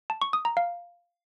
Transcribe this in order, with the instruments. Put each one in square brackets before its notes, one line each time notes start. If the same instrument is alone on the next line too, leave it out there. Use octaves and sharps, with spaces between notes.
[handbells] A5
C#6
D#6
A#5
F5